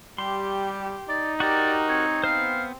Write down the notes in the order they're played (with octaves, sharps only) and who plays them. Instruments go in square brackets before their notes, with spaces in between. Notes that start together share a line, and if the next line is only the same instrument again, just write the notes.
[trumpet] G3 [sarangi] G4 [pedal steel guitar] C6
[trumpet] D#4 [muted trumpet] D5
[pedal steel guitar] F#4 A#4 [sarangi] G4 [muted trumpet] D5
[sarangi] C4 [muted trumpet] C#5
[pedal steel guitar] B3 C5 [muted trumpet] F5